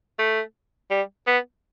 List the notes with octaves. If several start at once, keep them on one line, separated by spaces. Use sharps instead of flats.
A3
G3
B3